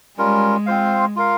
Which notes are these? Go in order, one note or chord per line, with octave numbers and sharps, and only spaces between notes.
G3 G#3 C#4 F4 A#4
C4 F4 C5 F5
F4 A#4 F5